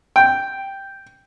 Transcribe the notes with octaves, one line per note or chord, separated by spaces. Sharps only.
G5